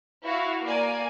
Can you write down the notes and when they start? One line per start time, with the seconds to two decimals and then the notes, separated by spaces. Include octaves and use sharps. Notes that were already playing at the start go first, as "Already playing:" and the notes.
0.23 E4 F#4 F5
0.65 A#3 A#4 D5 G#5